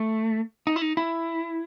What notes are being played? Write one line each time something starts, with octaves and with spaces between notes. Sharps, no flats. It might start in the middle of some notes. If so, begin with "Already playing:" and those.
Already playing: A3
D#4
E4
D#4
E4